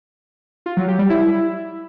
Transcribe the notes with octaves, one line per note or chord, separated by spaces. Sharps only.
F4
F#3
G4
G3
E4